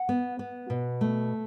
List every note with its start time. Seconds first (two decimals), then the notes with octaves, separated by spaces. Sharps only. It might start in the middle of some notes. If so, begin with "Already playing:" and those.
Already playing: F#5
0.09 B3
0.39 B3
0.70 B2
1.01 A3